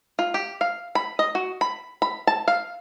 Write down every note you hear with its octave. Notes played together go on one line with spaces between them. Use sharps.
F4
G4
F5
B5
D#5
F#4
B5
B5
A5
F5